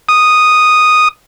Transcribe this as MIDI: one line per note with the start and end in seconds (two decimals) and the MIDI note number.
0.09 1.08 87